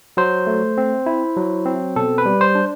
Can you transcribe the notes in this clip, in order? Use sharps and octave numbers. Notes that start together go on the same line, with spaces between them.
F#3 C5
A3
C4
E4
F#3
C4
B2 A4
B4
G3
C5
D4